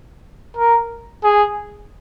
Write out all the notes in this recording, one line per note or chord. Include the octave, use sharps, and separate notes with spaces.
A#4
G#4